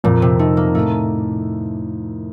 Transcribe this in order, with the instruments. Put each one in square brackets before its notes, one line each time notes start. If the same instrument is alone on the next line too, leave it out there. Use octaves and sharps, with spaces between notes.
[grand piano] F2 [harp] A#2
[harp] C3
[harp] A3 [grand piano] D#4
[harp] A#3
[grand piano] A2 [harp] A3